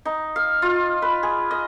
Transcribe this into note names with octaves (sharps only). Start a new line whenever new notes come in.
D#4
F5
F4
B4
G#4
D#5